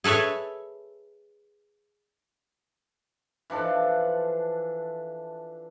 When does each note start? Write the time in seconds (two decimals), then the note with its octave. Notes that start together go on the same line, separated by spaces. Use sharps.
0.04 G#4 A4 B4 C#5 E5
3.50 E3 F3 D4 A4